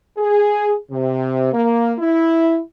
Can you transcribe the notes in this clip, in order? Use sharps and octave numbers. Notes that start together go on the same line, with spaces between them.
G#4
C3
A#3
E4